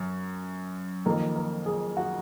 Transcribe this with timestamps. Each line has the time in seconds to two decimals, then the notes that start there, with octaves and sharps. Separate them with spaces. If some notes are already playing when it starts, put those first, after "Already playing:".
Already playing: F#2
1.05 F2 D#3 A#3 A#4
1.36 A#4
1.66 G#4
1.97 F#4